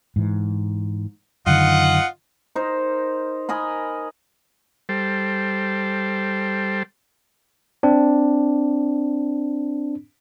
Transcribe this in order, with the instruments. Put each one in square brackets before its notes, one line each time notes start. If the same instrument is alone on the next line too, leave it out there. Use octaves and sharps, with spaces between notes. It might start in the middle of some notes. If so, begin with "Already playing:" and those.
[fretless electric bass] G#2 E3
[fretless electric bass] F#2 D3 D#3 [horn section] F4 D#5 F#5
[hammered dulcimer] D#4 A#4 C5
A#4 D#5 G#5 B5
[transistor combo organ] G3 A4 C5
[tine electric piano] C4 D4